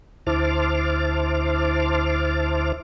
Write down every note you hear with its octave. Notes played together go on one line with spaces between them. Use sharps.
D2 E4 C5 A5 D6 F6